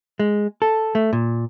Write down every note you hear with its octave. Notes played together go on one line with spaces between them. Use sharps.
G#3
A4
A3
A#2